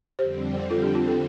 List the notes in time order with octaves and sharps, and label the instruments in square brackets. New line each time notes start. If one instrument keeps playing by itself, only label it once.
[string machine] F2 D3 G3 C4 [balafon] G4 C5
[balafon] F4 A4
D4 G4
C4 F4
F4 A4